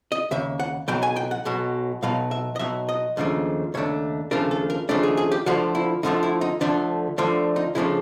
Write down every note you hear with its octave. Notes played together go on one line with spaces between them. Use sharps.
D#5
D#2 C#3 E5
F#5
B1 B2 F#3 G5
G#5
G5
F#5
B1 B2 F#3
B1 B2 F#3 F5
E5
D#5
B1 B2 F#3 E5
D#5
D#2 C#3 F3 A3 D4
D#2 C#3 A3 D4 C#5
D#2 C#3 F3 A3 D4 A#4
A4
A#4
D#2 C#3 F3 A3 D4
G#4
G#4
G4
D2 D3 F3 A3 F#4
E4
D2 D3 F3 A3 D#4
E4
D#4
D2 D3 F3 A3 D4
D2 D3 F3 A3 D4
D#4
C#2 C#3 F3 A3 D4 E4